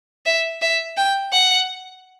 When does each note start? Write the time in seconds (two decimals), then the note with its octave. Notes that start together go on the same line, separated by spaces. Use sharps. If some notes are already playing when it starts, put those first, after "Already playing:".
0.26 E5
0.62 E5
0.97 G5
1.32 F#5